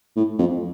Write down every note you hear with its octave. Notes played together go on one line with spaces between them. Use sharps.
A2
F2